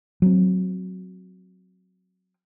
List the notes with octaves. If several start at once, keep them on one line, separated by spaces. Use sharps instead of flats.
F#3 C4